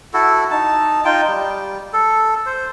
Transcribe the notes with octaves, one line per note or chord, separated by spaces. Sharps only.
E4 F#4 A4
D#4 A5
D#4 F4 G5
G3
A4
C5